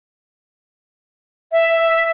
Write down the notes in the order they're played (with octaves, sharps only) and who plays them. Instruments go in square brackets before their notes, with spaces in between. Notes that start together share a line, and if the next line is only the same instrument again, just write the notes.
[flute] E5